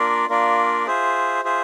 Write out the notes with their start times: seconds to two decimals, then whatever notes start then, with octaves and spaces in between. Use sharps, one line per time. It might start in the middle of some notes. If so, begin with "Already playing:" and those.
Already playing: A#3 D4 F4 A#4 D5
0.29 A#3 D4 F4 A#4 D5
0.86 F4 G#4 C5 E5
1.44 F4 G#4 C5 E5